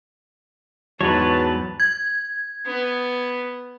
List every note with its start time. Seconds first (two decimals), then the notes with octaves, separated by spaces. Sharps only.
1.01 E2 G#2 F#3 B4 C#5 A5
1.80 G#6
2.66 B3